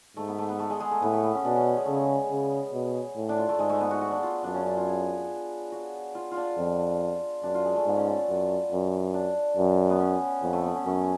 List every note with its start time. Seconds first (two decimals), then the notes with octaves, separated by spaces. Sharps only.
0.17 G#2 A3
0.27 B3
0.38 A3
0.49 B3
0.59 A3
0.70 G#3
0.80 G#3
0.91 A3
1.02 A2 B3
1.13 A3
1.23 B3
1.35 C#4
1.45 B2 D4
1.56 C#4
1.77 G#3
1.86 C#3 A3
1.95 G#3
2.31 C#3
2.73 B2
3.16 A2
3.29 D4
3.38 F4
3.49 A3
3.58 G#2 G#3
3.69 A3
3.81 B3
3.91 F#4
4.01 F#4
4.12 D4
4.23 F4
4.44 F#2 D4
4.54 C#4
4.66 D4
4.77 F4
4.87 G#4
5.72 F#4
6.15 F4
6.31 F4
6.37 D4
6.58 F2
7.43 F#2 D4
7.54 F4
7.65 G#3
7.76 A3
7.86 G#2 B3
7.97 C#4
8.07 D4
8.18 F4
8.29 F#2
8.72 F#2
9.14 D4
9.57 F#2
9.90 B3
10.00 C#4
10.42 F2 B3
10.53 A3
10.64 B3
10.75 C#4
10.85 F#2 C#4